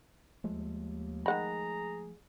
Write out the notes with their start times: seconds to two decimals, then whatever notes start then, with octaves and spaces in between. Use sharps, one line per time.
0.44 D#2 F3 G#3 A3
1.26 D#3 G#4 F#5 A#5 B5